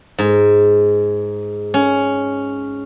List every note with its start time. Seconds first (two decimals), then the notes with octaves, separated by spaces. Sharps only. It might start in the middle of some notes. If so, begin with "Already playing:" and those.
0.18 G#2
1.74 C#4